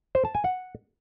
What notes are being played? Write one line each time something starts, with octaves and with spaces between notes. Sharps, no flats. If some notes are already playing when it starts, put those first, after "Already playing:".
C5
A5
G#5
F#5